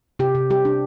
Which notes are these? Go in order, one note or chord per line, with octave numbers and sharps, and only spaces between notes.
C3 G4
C3
G3 G4
D4